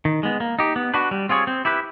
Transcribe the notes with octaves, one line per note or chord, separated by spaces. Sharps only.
D#3
G#3 B3
A#3
D#4 G4
B3
D4 F#4 B4
G3
C4 F4 G#4 C#5
C4
E4 G4 B4